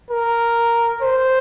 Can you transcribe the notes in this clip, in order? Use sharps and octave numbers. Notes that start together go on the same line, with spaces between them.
A#4
C5